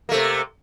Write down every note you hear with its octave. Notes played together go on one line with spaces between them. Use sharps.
C3 A3 A#3